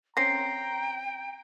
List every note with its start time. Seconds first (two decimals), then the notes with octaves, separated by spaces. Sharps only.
0.17 C4 C#4 G5 A#5 A#6 C7